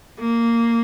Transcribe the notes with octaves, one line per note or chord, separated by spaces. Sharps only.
A#3